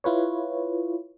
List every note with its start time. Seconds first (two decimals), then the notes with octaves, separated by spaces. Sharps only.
0.04 E4 F4 B4 C#5